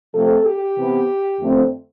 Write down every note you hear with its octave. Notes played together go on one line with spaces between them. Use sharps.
C3 F3 A3 A4
G4
C3 E3 B3
F2 D3 A3 C4